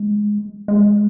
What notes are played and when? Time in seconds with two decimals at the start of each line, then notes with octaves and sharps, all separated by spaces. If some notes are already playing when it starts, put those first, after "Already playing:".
Already playing: G#3
0.68 G#3